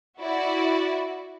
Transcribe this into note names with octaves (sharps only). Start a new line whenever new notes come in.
E4 F#4 D5 E5